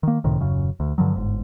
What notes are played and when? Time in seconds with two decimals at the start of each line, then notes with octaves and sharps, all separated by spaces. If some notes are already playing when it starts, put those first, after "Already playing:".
0.03 D#3 A#3
0.24 C#2 A2 C3 D#3
0.39 D#1 F#2 C#3
0.80 D2
0.98 G2 D3 F3 F#3
1.16 G1 G#2